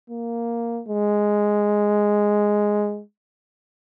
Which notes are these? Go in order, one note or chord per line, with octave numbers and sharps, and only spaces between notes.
A#3
G#3